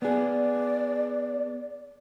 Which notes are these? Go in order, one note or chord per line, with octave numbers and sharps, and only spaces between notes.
B3 G#4 D5